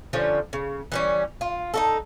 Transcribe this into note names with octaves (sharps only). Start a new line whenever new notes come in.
D3 F3 G3 C#4
C#3
E3 G3 C#4
F4
D#4 F#4 A4